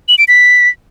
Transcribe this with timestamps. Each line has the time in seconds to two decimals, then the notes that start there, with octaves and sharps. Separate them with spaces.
0.08 F#7
0.18 D7
0.28 B6